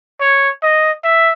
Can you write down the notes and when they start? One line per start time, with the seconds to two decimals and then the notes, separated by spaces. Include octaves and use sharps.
0.21 C#5
0.63 D#5
1.04 E5